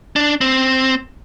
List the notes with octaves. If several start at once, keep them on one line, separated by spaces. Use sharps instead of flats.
D4
C4